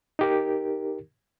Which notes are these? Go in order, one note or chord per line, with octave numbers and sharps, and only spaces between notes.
D#4 G4 A#4